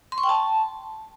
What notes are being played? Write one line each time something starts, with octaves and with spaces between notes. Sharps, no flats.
C6
C#6
G5
A5